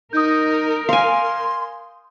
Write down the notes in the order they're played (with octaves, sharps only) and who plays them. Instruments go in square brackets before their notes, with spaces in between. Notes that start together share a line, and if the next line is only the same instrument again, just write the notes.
[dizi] D#4 [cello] A#4 [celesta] D#6 G6
[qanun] F5 G#5 [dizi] C6